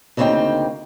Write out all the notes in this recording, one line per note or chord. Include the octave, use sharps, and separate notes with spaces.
D2 C#3 A#3 C4 D#4 G5